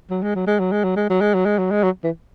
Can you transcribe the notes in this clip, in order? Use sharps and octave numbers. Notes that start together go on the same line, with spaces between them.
F#3
G#3
F#3
G#3
F#3
G#3
F#3
G#3
F#3
G#3
F#3
G#3
F#3
G#3
F#3
E3